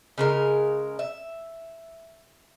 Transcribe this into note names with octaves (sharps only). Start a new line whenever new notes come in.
C#3 G#3 A#4
E5